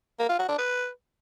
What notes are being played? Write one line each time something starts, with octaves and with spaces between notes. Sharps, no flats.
A#3
F4
F#4
D4
B4